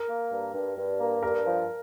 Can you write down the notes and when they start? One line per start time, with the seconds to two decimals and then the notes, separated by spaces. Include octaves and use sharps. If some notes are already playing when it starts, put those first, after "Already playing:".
Already playing: A#4
0.08 A#3
0.31 G2
0.54 G2
0.77 G2
1.00 A#3
1.23 G2 A#4
1.46 F3